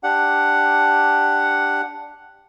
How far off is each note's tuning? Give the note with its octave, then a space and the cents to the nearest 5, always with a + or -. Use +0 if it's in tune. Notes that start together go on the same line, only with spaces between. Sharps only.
D4 +0 G4 +0 F#5 +0